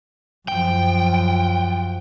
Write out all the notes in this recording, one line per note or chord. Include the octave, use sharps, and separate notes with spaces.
F#2 F3 G5